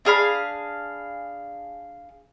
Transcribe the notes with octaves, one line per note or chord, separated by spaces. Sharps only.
D4 G#4 F5 B5